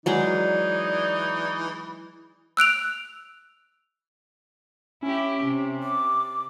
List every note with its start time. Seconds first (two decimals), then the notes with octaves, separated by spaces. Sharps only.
0.06 E3 F#3 G#3 D#4 G#4 D5
2.57 E6 F#6 D7 F7
5.03 C#4 E4 G4
5.44 C3
5.83 D6